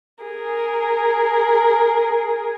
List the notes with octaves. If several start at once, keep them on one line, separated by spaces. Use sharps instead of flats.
G#4 A#4